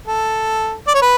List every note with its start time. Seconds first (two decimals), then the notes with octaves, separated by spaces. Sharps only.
0.07 A4
0.87 D5
0.95 C#5
1.02 B4